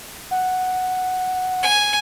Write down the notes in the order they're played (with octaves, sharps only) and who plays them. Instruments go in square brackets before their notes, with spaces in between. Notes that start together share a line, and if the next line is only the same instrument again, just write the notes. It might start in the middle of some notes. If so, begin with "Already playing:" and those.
[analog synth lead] F#5
[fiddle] G#5